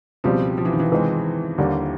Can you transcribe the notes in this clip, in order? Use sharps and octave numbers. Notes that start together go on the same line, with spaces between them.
C#2 B2 F3 G3 C4
F3
E3
D#3
E3
C3 E3 G#3 C4
D#2 D3 G3 A#3